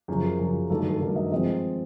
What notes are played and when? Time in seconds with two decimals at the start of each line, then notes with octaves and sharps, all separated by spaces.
0.08 F#2 C#3 F3 G#4
0.24 A#4
0.39 F#2 C#3 F3
0.70 G2 D#3 F#3 A3 A4
0.80 A4
0.90 A4
1.01 G2 D#3 F#3 A3 A#4
1.16 D#5
1.31 F3 G#3 C4 D#5